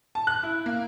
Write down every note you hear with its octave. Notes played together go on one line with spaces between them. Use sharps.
A5
F#6
E4
A#3